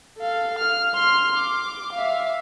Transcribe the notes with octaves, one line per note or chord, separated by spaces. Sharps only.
A4 F5
F6
C6 F6
D6
E5 F5